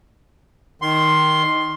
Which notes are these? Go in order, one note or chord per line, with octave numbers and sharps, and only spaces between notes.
D#3 C6